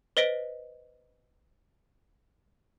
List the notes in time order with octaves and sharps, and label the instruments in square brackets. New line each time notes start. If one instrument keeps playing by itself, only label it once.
[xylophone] B4 C5 D#5 A#6 B6 D7